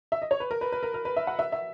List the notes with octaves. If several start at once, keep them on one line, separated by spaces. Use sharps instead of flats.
E5
D#5
C#5
B4
A#4
B4
B4
A#4
A#4
B4
E5
F#5
E5
E5